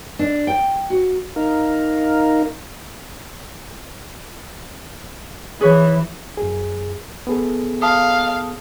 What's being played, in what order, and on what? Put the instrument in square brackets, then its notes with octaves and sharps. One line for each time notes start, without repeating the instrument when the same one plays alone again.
[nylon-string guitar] D4
G5
F#4
[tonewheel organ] D#4 A#4 F5
[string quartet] E3 [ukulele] G#4 B4 C#5
[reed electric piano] F#2 G#4
B3 G#4 A4
[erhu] F5 [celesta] A5 D#6